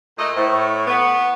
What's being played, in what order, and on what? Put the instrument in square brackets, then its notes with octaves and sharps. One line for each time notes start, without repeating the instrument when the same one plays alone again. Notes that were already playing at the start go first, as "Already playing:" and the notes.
[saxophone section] A#2 A3 D#5
[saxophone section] A2 [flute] C5
[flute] C#6
[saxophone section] B3